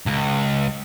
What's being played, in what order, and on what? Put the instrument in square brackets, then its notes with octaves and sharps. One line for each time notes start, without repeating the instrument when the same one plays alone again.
[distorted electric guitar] C#2